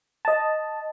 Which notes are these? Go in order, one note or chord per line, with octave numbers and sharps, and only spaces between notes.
D#5 A5